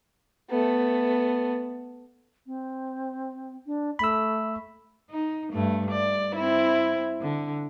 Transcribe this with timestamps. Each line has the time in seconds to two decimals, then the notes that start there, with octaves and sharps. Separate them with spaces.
0.50 A3 B3
2.47 C4
3.66 D4
3.99 A3 B5 E6
5.10 D#4
5.53 G2 A3
5.91 D5
6.36 C4 E4
7.21 D3